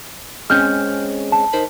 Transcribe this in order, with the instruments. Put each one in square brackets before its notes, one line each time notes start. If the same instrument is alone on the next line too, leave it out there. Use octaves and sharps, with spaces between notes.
[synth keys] G#3 C4 C#4 [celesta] F6 G6
[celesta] A5
[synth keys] D#3 C5 B5